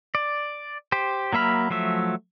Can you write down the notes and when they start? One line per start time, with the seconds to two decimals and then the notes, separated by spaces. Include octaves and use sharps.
0.15 D5
0.92 G4 C5
1.33 F#3 A#3 E5 B5 F6
1.70 F3 F#3 A3 E5